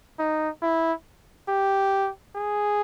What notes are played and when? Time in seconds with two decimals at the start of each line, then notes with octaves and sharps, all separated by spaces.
0.19 D#4
0.62 E4
1.49 G4
2.36 G#4